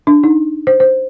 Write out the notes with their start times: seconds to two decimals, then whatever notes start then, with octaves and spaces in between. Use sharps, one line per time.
0.07 D4
0.24 D#4
0.67 C5
0.80 C5